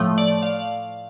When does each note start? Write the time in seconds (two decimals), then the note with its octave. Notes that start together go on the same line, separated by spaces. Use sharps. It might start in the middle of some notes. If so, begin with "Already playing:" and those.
Already playing: A2 F3 A3
0.18 D5
0.43 F5